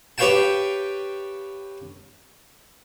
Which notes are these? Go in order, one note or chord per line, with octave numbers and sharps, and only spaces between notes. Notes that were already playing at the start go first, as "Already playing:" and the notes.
G4 B4 C#5 F5 G5 A5